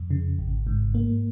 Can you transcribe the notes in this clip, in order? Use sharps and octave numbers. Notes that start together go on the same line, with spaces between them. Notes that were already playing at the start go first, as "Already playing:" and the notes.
Already playing: F2
C#3
G#1
G#2
A#3